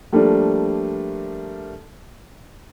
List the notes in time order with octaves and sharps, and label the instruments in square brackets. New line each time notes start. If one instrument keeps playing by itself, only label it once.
[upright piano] F3 G3 A3 A#3 D4